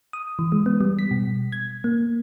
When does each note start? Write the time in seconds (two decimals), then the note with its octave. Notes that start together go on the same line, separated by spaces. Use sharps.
0.13 D#6
0.39 E3
0.52 G#3
0.66 B3
0.81 G3
0.99 B6
1.11 B2
1.52 G#6
1.84 A#3